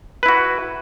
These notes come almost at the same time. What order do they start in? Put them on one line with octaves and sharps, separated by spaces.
B4 E4 F#4